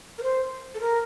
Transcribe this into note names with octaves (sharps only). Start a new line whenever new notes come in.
A#4
C5
A4
A#4